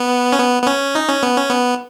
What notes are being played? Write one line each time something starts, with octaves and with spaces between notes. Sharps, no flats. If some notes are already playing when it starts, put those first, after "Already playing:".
Already playing: B3
C#4
B3
B3
C#4
D#4
C#4
B3
C#4
B3